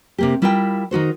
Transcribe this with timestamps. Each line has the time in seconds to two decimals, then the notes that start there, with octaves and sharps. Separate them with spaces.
0.18 C3 A#3 G4
0.42 G3 E4 F4 A#4 E5 G5
0.91 D#3 D#4 F#4 C5